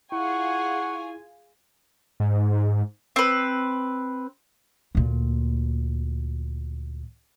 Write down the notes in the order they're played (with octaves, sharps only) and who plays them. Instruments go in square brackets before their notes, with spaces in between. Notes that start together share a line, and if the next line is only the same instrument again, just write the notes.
[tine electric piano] E4 [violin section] F4 G#4 G#5 [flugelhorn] F#5 [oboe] C#6
[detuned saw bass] G#2
[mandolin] C4 B4
[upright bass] D2 A#2